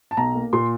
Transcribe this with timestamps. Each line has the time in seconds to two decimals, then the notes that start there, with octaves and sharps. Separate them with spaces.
0.11 A5
0.17 B1 A#5
0.35 A#3
0.53 A#2 C6